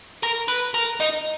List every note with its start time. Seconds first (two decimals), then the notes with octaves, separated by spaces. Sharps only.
0.23 A#4
0.48 B4
0.75 A#4
1.00 D#4